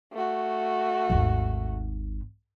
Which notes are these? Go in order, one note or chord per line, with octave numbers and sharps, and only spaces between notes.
A3 F#4
G#1 D#2